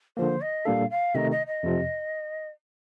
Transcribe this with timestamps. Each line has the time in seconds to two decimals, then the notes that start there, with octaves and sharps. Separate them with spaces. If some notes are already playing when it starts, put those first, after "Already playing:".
0.17 D3 F3 A#3 C5
0.41 D#5
0.65 A#2 G3 A#3 D4 A4 F5
0.90 F5
1.15 C3 D#3 A3 D#4 D#5
1.31 D#5
1.47 D#5
1.63 F2 C3 F3